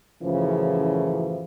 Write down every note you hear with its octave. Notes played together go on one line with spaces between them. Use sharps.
F#2 A2 C#3 E3 F3